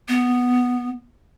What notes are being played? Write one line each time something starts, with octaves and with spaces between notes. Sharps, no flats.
B3